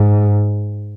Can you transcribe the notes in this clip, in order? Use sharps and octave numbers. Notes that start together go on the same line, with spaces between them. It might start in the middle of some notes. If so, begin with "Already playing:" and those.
Already playing: G#2